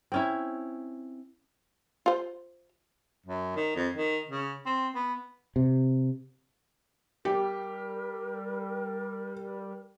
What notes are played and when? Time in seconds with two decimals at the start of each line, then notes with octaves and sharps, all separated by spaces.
0.12 C4 C#4 E4
2.06 F4 C5
3.26 F#2
3.56 D#3
3.76 F2
3.96 D#3
4.30 C#3
4.66 C4
4.95 B3
5.56 C3
7.25 G3 G4 A#4